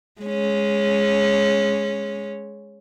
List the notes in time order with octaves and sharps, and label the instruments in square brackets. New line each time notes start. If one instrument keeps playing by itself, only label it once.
[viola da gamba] G#3 C#4